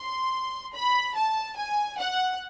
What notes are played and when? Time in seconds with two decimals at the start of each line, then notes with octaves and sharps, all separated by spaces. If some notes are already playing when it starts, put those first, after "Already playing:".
Already playing: C6
0.74 B5
1.15 A5
1.56 G#5
1.98 F#5